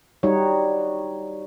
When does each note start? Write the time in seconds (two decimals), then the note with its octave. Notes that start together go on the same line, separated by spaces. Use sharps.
0.23 G3 D#4 F#4 C#5